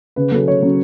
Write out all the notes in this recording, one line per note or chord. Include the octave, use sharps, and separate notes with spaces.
C#3 B4
F#3 C#4 A4
C#3 C#5
F#3 C#4